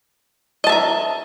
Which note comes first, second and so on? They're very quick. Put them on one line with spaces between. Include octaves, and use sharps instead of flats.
D#5 A5 E5 A#5